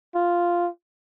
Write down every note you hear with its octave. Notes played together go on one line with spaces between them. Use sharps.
F4